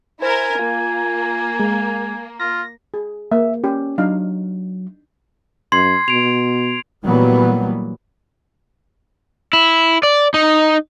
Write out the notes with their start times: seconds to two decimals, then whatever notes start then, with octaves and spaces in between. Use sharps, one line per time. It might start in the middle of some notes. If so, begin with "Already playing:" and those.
0.22 E4 A#4 C5 G#5
0.59 A#3 F4
1.60 G#3
2.40 F4 A#6
2.94 G#4
3.32 A#3 E5
3.64 C#4 G4
3.98 F#3 D4 D#4 F5
5.72 F#2 C6 G#6 C7
6.08 B2 D7 F7
7.04 A#2 E3 F#3 G3 A#3 B3
9.53 E4
10.03 D5
10.34 D#4